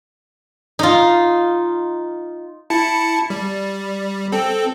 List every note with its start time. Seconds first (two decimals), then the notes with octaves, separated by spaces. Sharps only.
0.79 D#4 F4
2.70 E4 A5 C#7
3.30 G3
4.32 C4 A4